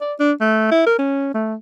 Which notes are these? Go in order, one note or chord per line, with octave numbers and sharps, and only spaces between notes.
D5
D4
A3
E4
A#4
C#4
A3